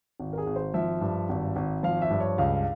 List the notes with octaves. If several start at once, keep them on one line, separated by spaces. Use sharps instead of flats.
G#1
A#4
G#4
G#1
C5
F3 E5
G2
G#1
G#1
F3 F5
E5
G2
C#5
C#2 F5